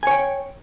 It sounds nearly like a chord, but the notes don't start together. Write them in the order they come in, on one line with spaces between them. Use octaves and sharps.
G#5 C#5 G5